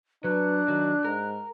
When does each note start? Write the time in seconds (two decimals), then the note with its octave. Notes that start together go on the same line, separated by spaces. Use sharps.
0.24 F#3 D4 B4 F#6
0.68 D#3 F#3
1.05 G#2 A#4